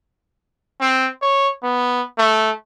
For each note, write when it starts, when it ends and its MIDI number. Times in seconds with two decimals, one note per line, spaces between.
0.81 1.08 60
1.22 1.49 73
1.63 2.02 59
2.18 2.51 57